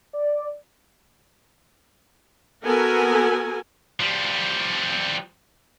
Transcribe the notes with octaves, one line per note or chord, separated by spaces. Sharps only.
D5
B3 F#4 A4 A#4 G#5
F3 G3